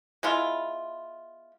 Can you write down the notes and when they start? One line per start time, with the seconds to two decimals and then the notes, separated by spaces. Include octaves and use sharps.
0.23 G#3 B3 E4 F4